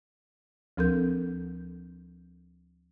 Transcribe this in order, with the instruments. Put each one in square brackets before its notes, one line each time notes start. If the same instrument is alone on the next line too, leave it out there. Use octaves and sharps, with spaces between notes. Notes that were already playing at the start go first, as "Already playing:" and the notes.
[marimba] D2 F3 C4 A4 A#4 G6